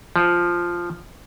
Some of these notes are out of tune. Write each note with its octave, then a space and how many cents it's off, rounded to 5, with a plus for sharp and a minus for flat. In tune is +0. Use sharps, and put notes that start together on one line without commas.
F3 -5